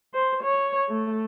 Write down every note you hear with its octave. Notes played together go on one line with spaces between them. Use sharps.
C5
C#5
A3